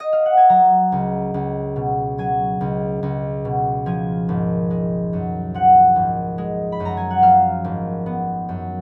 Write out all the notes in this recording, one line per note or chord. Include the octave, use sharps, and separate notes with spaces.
D#5
F5
F#5
G#5
F#3 A#5
C#2
C#2
B2
F#3 G#5
C#2
C#2
B2
F3 G#5
G#1
G#3
F#2
F3 F#5
G#1
G#3
B5
F#2
A#5
G#5
F#5
F3 F5
G#1
B3
F#2